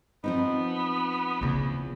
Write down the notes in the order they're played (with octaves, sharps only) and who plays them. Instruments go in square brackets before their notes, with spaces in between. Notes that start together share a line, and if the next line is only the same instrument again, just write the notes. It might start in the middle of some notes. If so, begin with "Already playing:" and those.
[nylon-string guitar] F3 C4 D#4 [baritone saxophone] B3
[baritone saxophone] E2 [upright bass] C#3 A#3